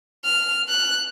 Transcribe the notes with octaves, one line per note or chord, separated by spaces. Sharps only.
F6
F#6